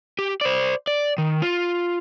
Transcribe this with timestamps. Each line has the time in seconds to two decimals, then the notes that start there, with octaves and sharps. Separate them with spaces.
0.19 G4
0.41 C5 D5
0.87 D5
1.18 D#3
1.42 F4